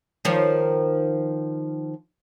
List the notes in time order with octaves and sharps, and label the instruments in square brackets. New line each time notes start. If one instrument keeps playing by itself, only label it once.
[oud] D#3 F3 C#5